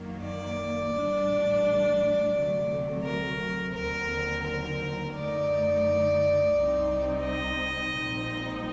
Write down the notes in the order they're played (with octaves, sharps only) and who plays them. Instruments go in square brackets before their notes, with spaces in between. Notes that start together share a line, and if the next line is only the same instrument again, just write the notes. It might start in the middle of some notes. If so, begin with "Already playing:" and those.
Already playing: [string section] F#2 D#3 F#3 A#3
[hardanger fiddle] D5
[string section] A1 A2 G3 D4
D2 C3 F#3 A3
[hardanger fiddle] A#4
[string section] D#2 D3 F#3 C4 [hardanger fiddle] A#4
[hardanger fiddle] A#4
[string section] F#2 D3 A3 D#4 [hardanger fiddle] D5
[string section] C2 C3 G3 C4 D#4
[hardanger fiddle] D#5
[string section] A#1 A#2 G3 C4 D#4